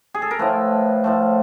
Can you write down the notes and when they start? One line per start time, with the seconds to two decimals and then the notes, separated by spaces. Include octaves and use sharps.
0.14 G#4
0.22 A4
0.31 A#4
0.39 A2 F3 A3 B4
1.04 A2 F3 A3